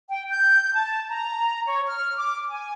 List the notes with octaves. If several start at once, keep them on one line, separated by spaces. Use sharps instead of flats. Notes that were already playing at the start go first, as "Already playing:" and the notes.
G5
G6
A5
A#5
C#5
F6
D6
G#5